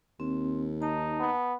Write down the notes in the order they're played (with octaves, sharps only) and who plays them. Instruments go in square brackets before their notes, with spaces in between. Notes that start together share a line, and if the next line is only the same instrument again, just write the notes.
[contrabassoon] D#2 [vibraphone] C4
[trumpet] D#4 [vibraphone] A5
[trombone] B3